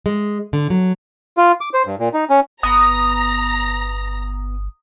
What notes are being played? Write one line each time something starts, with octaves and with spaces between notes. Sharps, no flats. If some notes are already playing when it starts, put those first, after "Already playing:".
G#3
D3
F#3
F4
D6
C5
G2
A#2
D#4
C#4
G1 B3 A#5 D#6 A#6